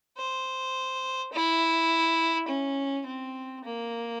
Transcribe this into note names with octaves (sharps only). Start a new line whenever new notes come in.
C5
E4
C#4
C4
A#3